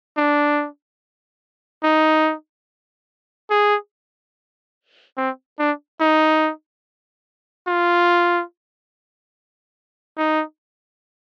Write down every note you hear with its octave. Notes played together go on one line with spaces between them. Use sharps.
D4
D#4
G#4
C4
D4
D#4
F4
D#4